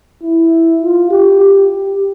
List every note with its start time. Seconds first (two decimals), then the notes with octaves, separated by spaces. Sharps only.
0.23 E4
0.82 F4
1.11 G4
1.42 G4